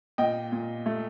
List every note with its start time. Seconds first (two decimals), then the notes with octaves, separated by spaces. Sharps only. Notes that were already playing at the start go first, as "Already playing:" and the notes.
0.18 A#2 D#5 G5
0.52 A#2
0.86 A3